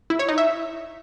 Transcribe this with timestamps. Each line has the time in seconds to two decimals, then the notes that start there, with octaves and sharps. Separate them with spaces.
0.10 E4
0.19 C#5
0.29 D#4
0.38 E5